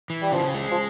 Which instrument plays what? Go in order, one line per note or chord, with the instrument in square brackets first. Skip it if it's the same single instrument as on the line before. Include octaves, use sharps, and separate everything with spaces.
[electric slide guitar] E3
[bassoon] G3
[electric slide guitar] C#3 [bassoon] F3
[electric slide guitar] G#3
[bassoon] F3